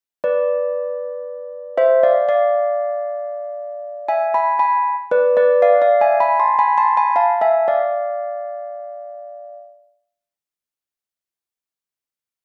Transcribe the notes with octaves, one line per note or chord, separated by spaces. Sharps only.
B4 D5
C5 E5
D5 F5
D5 F5
E5 G#5
G#5 B5
G#5 B5
B4 D5
B4 D5
D5 F5
D5 F5
E5 G#5
G#5 B5
A5 C6
G#5 B5
A5 C6
G#5 B5
F5 A5
E5 G#5
D5 F5